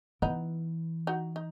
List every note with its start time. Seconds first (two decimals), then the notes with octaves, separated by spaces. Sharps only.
0.22 E3 B3 D#4
1.07 D#4 F#4
1.36 D#4